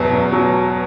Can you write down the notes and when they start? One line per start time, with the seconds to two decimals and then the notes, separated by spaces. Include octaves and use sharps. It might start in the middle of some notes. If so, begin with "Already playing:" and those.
Already playing: E2 B2 F#3
0.11 E2
0.32 F#3